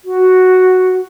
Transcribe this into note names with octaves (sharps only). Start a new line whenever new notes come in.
F#4